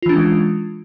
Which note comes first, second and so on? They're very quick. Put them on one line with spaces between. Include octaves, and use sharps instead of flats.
F4 E3 D4 C#4 G#3